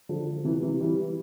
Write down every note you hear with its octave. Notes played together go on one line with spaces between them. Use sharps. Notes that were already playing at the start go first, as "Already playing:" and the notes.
D3 F3
C3 E3
C3 E3
E3 G3